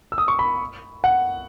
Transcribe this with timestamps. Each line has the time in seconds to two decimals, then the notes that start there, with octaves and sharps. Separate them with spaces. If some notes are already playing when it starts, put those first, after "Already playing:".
0.12 E6
0.18 D#6
0.28 C#6
0.39 B5
1.04 F#5